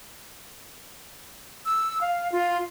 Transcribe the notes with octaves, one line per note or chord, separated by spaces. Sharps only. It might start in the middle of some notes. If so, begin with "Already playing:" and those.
E6
F5
F4